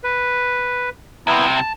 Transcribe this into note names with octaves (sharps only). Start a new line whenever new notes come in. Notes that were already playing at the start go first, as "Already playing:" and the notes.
B4
C2 C3 B3 E4
A5